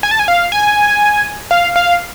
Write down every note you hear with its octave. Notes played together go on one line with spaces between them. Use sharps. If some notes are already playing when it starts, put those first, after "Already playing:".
G#5
A5
G#5
F5
G#5
F5
F5